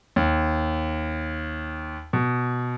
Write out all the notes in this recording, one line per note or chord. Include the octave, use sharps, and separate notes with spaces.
D#2
B2